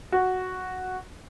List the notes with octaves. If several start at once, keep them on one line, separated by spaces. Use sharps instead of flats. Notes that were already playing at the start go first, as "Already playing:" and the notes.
F#4